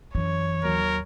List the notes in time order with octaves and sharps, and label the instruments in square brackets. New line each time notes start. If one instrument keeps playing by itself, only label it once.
[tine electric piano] F#2 [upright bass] E3 [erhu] C#5
[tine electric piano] D#2 F#3 [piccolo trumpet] A#4